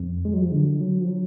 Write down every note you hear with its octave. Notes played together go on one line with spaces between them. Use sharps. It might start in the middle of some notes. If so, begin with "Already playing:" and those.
Already playing: F2
G#3
F#3
F3
D3
F#3
F3
F#3